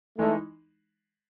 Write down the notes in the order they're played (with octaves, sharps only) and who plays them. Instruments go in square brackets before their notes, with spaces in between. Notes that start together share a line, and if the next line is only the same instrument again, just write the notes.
[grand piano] E3 G#3 D#4 [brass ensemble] A3